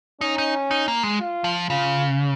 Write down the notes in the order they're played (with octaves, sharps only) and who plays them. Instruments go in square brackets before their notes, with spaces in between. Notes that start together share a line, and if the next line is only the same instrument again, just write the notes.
[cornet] C#4 [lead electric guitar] D#4
[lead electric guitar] D#4
D#4
A#3
G#3
[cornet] F4
[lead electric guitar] F3
[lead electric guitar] C#3 [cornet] F4